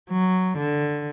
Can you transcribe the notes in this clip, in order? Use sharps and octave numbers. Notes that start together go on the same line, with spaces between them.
F#3
D3